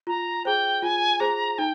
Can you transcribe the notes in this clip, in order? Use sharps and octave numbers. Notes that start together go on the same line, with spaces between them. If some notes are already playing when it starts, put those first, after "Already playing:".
F4 A#5
G#4 C5 G5
F4 G#5
G#4 C5 A#5
D#4 G5